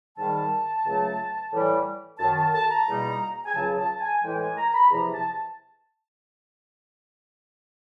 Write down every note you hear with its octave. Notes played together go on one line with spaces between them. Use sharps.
G#2 D#3 G3 A5
C#2 C#3 F#3 A3
A2 E3 G3
F#2 D#3 F#3 A5
A5
A5
A#5
E2 B2 G3 A#3 D#4
G#5
C#2 C#3 F#3 A5
A5
G#5
A2 E3 G#3 G5
G#5
A#5
B5
E2 C3 F3 A#5
A5